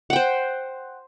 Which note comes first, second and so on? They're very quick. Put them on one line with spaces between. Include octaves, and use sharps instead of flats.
F#5 G5 C5